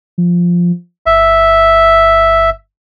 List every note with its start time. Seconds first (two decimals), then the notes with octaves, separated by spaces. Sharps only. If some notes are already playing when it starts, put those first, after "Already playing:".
0.18 F3
1.06 G1 E5